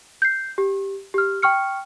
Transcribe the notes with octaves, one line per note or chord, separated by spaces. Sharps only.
G6 C7
G4
G4 F6
G5 C#6 F6 C#7